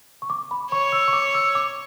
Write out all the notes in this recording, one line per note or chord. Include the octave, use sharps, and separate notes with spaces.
C#6
D6
B5
C#5 C#6
E6
C#6
D6
E6
D6